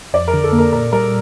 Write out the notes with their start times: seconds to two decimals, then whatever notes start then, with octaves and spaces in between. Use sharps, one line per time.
0.13 F2 D5
0.28 A#4
0.34 D3
0.44 A4
0.53 A#3
0.58 A#4
0.72 A#2 A#4
0.92 G3 A#4